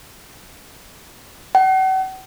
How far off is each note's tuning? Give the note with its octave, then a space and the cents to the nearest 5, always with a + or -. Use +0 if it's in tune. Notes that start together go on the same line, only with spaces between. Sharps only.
F#5 +40